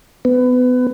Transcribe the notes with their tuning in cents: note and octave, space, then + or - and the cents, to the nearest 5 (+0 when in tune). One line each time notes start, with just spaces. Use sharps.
B3 +25